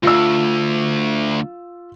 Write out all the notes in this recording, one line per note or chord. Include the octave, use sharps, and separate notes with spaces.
D2 F4 E6